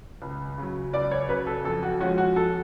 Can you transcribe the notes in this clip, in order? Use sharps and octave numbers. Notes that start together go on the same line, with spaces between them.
C#2
C#3 F#3
C#2 D5
C#5
C#3 F#3 B4
A4
F2 A4
F#4
F3 G#3 C#4 F#4
F#4
F2 A4